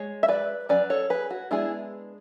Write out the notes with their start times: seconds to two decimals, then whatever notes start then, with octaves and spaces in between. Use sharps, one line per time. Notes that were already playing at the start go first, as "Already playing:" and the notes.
Already playing: G#3 C#5
0.23 E5
0.28 B4 D5
0.69 F#3 C#4 B4 D5
0.90 A4 C#5
1.10 G#4 B4
1.30 F#4
1.51 G#3 B3 D4 E4 G#4